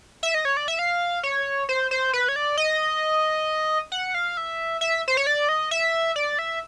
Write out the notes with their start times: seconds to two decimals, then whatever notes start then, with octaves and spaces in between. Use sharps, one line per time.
0.23 E5
0.34 D#5
0.45 C#5
0.57 D5
0.68 E5
0.79 F5
1.23 C#5
1.69 C5
1.91 C5
2.13 B4
2.29 C#5
2.36 D5
2.57 D#5
3.92 F#5
4.15 F5
4.37 E5
4.81 E5
5.08 C5
5.17 C#5
5.27 D5
5.49 D#5
5.71 E5
6.16 D5
6.39 E5